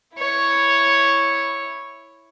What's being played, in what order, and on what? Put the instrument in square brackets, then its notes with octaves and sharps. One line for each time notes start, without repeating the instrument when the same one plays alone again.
[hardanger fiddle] E4 C#5